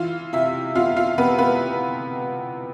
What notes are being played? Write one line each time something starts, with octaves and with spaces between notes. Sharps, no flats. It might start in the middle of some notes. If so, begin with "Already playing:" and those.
Already playing: E3 F4 F5
C3 E4 E5
B3 F4 F5
F4 F5
C3 B3 B4
B3 B4